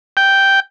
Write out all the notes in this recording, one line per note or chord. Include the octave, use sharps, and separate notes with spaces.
G5